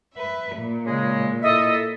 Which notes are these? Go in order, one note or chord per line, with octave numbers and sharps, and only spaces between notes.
B4 E5
A#2
C#3 G#3
E4 A4 D#5 E5